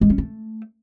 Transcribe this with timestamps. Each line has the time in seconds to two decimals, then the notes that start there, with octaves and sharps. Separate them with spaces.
0.01 G#3
0.10 C#4
0.18 A3